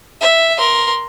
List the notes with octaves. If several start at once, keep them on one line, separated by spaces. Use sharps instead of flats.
E5
A#4 C6